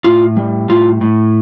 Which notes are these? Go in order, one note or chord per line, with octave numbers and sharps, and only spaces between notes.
A2 F4
G3
A2 F4
A2